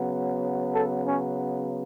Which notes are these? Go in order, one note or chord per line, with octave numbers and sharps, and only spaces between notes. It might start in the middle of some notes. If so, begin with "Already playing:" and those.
Already playing: C#3 F#3 B3
A4
C#4